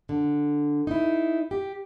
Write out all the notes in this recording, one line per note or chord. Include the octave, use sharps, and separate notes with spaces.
D3
D#4 E4
G4